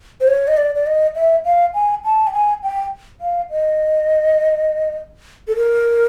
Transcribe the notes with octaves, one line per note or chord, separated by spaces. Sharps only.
C5
C#5
D#5
D5
D5
D#5
E5
F5
G#5
A5
G5
G#5
G5
F5
D#5
A4
A#4